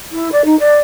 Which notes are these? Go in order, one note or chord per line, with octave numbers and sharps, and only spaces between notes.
E4
D5
D#4
D5